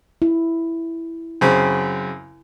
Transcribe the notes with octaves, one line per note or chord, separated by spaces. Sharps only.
E4
F#2 C#3 C4